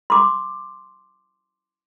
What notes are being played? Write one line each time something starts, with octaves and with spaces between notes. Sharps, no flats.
C6 D6